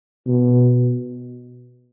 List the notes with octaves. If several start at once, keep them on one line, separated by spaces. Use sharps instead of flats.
B2